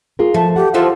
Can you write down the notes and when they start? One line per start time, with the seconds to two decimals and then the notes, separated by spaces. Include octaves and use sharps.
0.19 F4 G#4 A#4
0.34 F3 A3 A5
0.56 G4 F#5
0.74 E3 F3 F4 A4